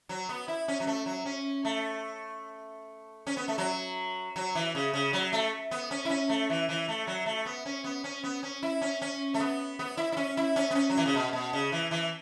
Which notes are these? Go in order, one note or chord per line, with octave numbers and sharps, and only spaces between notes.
F#3
B3
E4
C#4
F#3
A3
F#3
C#4
A3
C#4
B3
A3
F#3
F#3
E3
C#3
C#3
F#3
A3
B3
C#4
E4
C#4
A3
E3
E3
A3
F#3
A3
B3
C#4
B3
C#4
B3
C#4
E4
C#4
C#4
A3
B3
B3
E4
E4
C#4
E4
C#4
B3
C#4
F#3
E3
C#3
B2
B2
C#3
E3
E3